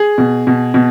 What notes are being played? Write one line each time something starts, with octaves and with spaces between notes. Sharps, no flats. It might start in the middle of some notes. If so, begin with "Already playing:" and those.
Already playing: G#4
B2
B2
B2